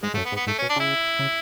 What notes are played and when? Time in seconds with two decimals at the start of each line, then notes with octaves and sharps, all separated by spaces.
0.03 G#2 G#3
0.14 G#2 A3
0.18 F#2
0.25 B3
0.32 G#2
0.36 B3
0.47 G#2 A3
0.58 C#4
0.62 B2
0.69 D4
0.76 C#3 E4
1.19 C#3